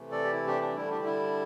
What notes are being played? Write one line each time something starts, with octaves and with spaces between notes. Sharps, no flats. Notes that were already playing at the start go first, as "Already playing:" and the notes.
Already playing: C3 E3 A3
A4 D5
G4
E4
D4 G4
D4
D3 G3 E4
D4 G4
E4